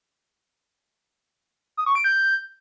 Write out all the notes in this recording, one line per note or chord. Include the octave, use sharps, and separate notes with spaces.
D#6
C#6
D7
G6